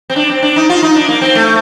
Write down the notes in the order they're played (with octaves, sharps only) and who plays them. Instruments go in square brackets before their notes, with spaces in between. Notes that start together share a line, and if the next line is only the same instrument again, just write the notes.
[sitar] C4
D4
C4
D4
D#4
F4
D#4
D4
A#3
C4
A3